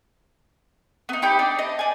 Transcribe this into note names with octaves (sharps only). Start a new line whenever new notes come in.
B3 D#4
D#4 G4 B5 G6
D4
D#5
D5 G#5